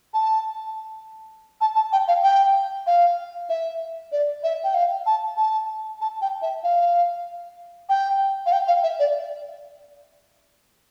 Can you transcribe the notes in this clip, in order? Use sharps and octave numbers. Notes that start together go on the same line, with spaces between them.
A5
A5
A5
G5
F5
G5
F5
E5
D5
E5
G5
F5
A5
A5
A5
G5
E5
F5
G5
F5
G5
F5
E5
D5